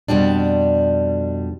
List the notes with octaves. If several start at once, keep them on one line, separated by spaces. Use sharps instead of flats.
F2 B2 G3 D4